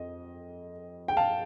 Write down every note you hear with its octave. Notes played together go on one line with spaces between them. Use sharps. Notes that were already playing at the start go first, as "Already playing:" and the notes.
Already playing: F2 D#5
G5
F5 A5